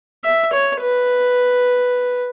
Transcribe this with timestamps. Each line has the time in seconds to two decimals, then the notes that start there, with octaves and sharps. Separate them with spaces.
0.24 E5
0.53 C#5
0.81 B4